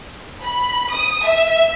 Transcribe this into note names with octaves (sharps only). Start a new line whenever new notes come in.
B5
D#6
E5